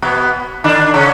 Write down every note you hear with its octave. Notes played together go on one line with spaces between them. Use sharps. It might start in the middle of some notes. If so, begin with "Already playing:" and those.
B2 B3
D3 D4
C#3 C#4